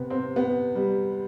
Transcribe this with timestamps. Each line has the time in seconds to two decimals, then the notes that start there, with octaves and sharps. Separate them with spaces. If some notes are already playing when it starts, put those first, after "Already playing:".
Already playing: C3 B3
0.10 C4
0.36 B3
0.75 G3